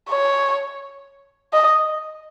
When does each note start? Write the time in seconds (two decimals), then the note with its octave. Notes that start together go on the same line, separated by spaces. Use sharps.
0.10 C#5
1.53 D#5